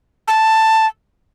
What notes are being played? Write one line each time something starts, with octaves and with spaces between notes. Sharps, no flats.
A5